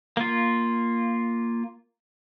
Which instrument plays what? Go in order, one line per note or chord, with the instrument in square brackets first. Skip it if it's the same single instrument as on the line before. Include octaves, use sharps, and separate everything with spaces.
[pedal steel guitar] A#3 F4